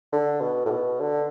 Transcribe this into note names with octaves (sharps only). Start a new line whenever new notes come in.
D3
B2
A2
B2
D3